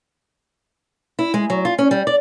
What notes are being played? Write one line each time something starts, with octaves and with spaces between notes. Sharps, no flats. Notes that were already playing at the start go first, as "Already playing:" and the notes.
E4
G#3
F#3
F4
C#4
G3
D5